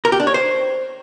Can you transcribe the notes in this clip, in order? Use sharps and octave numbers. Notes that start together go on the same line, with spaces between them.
A#4
G4
D4
C#5
C5